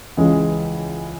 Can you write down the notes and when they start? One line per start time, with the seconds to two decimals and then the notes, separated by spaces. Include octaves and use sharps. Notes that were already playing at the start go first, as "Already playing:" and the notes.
0.17 C#2 C#3 E3 G#3